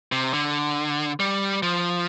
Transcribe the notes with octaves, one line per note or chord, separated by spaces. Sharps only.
C3
D3
G3
F3